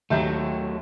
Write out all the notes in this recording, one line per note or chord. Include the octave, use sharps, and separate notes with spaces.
D#2 F#3 A3 E5 G6